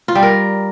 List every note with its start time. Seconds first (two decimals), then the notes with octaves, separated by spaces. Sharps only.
0.08 F4
0.15 G3
0.23 A#4